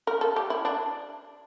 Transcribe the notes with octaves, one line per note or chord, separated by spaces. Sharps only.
A#4
A4
G4
E4
D4